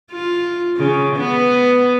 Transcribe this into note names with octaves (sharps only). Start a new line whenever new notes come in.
F4
C#3
B3